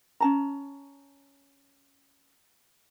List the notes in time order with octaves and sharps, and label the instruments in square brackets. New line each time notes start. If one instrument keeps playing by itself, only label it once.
[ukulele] C#4 A5 A#5